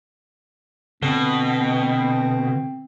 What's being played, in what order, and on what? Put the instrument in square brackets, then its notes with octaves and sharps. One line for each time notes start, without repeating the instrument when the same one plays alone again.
[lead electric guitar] B2 [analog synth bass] D3 [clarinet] C4